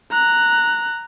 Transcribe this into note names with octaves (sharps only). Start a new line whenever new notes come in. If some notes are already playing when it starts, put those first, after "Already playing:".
A#5 F#6